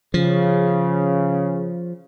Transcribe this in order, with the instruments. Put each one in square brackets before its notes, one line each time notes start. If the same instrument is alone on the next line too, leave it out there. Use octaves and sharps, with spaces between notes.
[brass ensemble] C#3 [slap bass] F3